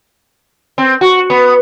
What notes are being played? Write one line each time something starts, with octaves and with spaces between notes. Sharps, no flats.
C4
F#4
B3